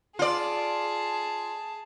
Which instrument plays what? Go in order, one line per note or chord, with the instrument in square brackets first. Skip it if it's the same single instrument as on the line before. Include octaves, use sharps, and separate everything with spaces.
[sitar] F4 D5 [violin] G#4 A5